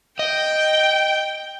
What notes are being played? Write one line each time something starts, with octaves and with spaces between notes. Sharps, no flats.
D#5 G5